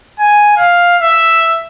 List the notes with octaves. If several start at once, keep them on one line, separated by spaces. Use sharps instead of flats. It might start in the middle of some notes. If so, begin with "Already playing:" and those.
G#5
F5
E5